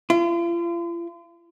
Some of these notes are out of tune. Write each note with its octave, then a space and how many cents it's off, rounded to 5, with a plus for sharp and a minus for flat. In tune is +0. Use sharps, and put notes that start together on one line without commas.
F4 -40